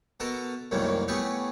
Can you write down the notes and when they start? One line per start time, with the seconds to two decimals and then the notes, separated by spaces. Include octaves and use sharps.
0.20 B2 B3 A4 A#4 A5 A#5
0.71 C2 F#2 A2 D#3 E3 A#3
1.08 A2 A3 B3 G4 G#4 C#6